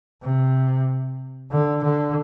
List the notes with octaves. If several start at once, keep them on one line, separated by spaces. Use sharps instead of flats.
C3
D3
D3